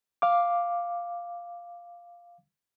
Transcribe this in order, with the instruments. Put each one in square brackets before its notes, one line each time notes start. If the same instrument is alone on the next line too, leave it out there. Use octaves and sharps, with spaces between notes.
[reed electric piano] F5 D6